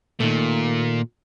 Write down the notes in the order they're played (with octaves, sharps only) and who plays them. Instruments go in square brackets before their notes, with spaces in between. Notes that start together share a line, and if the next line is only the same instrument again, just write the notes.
[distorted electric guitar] A#2 [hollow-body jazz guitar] D#3 A3